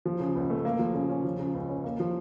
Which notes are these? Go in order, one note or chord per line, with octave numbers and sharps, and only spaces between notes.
F3
C#3
C#2
A3
A#3
F3
C#3
C#4
F3
C#3
C#2
C#4
A#3
F3